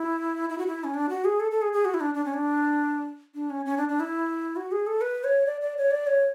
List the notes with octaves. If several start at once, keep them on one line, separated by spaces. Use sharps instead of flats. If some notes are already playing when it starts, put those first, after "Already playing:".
Already playing: E4
E4
F#4
E4
C#4
D4
F#4
G#4
A4
A4
G#4
G#4
F#4
E4
D4
D4
C#4
D4
D4
C#4
C#4
D4
D4
E4
F#4
G#4
A4
B4
C#5
D5
D5
C#5
D5
C#5